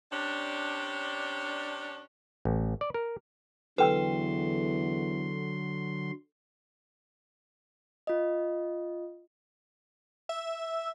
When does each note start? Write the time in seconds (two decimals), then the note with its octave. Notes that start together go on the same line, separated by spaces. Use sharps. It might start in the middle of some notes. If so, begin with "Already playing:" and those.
0.12 C3 C#4 D4
2.45 A1
2.81 D5
2.94 A#4
3.78 E2 D3 F#3 A4 B4 G5 C6 E6
8.07 F4 D#5
10.29 E5